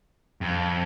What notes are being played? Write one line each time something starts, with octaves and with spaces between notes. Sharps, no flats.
F2